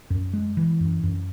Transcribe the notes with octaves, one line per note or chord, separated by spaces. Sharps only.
F#2
G#3
E3
F#2
F#2